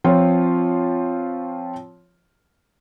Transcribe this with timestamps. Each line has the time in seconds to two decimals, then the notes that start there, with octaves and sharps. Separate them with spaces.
0.04 F3 C4 F4 C#5